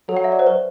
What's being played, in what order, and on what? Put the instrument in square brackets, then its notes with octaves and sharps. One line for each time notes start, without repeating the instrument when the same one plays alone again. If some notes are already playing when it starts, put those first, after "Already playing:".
[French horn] F#3 [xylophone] A4
[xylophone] F#5
E5
D5
C5
B4